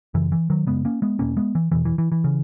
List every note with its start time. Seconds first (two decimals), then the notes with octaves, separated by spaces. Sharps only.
0.14 F#2 C#3 E3
0.32 E3
0.50 D#3 F#3
0.67 F#2 C#3 G#3 B3
0.85 A#3 C#4
1.02 G#3 B3
1.19 E2 B2 A#3 C#4
1.37 G#3 B3
1.55 E3
1.72 E2 B2 E3
1.85 E3
1.98 E3
2.12 E3
2.24 C#3